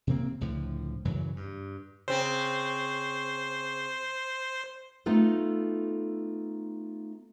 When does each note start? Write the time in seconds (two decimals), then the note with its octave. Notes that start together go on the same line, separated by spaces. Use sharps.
0.07 C3 D#3 A#3 C4
0.41 C#2 A2 D3 F3
1.05 F#2 C#3 E3 F#3
1.36 G2
2.08 C#3 C4 C5
5.06 A3 B3 D#4 F4 A4